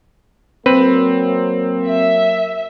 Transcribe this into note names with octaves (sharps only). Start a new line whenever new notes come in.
F#3 A#3 C4 A#4 B4
E5